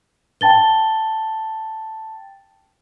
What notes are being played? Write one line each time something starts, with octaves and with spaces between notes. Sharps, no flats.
G5 A5 A6 G7